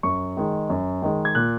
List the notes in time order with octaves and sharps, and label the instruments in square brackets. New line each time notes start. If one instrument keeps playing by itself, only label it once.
[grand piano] F#2 C#6
D#3 G#3
F#2
D#3 G#3
G#6
A#2 F#6